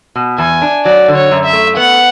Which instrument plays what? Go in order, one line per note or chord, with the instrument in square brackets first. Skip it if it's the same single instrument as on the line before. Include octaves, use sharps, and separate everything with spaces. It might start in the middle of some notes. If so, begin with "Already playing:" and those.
[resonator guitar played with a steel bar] B2
[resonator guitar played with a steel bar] E2 [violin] G#5
[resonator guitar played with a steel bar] D4
[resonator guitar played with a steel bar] F#3 [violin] D5
[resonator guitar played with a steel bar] D3
[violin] C#5
[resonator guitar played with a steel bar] F#2
[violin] E5
[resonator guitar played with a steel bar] A3
[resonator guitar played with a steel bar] B3 [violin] F#5